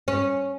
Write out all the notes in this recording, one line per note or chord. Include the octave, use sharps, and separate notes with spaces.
C#4